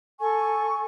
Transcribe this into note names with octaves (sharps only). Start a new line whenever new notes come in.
A4 G#5 C#6